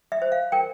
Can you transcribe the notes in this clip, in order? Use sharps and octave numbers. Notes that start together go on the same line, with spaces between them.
E5
C5
F5
A#4 G5